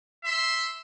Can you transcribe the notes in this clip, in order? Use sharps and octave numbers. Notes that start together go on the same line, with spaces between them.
E5 C6